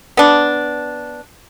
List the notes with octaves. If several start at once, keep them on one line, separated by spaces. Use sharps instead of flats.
B3 D4